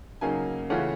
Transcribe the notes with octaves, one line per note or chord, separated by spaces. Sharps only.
C#3 F#3 A#3 D#4 G#5
C#3 E3 A3 C#4 F4 F#5